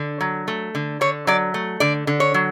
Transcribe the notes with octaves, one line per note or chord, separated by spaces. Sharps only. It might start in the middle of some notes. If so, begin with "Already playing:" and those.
Already playing: D3
F#3
A3
D3
D3 C#5
F#3 D5
A3
D3 D5
D3
C#5
F#3